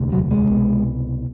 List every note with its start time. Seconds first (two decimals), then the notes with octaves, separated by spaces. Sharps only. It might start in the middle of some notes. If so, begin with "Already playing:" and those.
Already playing: E1 D2 C3
0.12 F#3
0.31 G#3
0.50 C2 B2